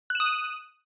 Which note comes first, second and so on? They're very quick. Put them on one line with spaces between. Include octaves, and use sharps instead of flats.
F#6 E7 D#6